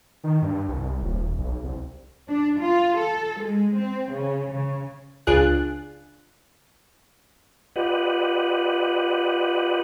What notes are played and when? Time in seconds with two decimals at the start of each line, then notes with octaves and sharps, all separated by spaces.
0.24 D#3
0.42 G2
0.68 C2
1.02 D#1
1.38 B1
1.63 C2
2.29 D4
2.61 F4
2.98 A4
3.41 G#3
3.78 C4
4.12 C#3
4.52 C#3
5.27 C#2 D4 F4 G#4 F#6
7.76 F4 G4 B4 D5 D#5 F#5